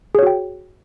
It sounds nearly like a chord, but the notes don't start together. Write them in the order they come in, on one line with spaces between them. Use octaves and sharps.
G#4 C#5 F#4 G5